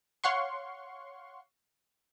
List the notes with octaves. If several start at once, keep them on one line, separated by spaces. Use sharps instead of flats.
C#5 F5 F#5 C6 C#6